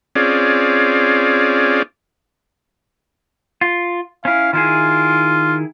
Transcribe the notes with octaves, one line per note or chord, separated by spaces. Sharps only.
C4 C#4 F4 G#4 D5
F4
C#4 E4 F5
D#3 E4 F4 G#4